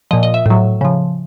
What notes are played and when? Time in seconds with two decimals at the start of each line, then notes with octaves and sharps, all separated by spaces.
0.11 A#2 F3 D#5
0.23 D#5
0.34 E5
0.46 A2 F#3
0.81 C#3 F3